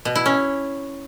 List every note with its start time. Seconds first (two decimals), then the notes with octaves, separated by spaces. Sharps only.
0.05 B2
0.15 E4
0.26 C#4